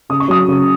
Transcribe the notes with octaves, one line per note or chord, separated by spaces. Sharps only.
C#3 D#6
C#6
F#3 D#6
C#3